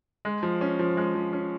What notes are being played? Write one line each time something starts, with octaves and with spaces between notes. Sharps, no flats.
G#3
F3
C#4
F3
G#3
F3
C#4